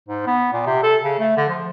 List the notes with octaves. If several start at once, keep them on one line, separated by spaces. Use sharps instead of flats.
G#2
B3
A#2
C3
A4
C#3
A3
D3
F3